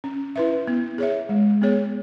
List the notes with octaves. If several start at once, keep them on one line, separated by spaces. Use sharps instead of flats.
C#4
E4 B4 E5
B3
G#4 C#5 E5
G#3
B3 G#4 C#5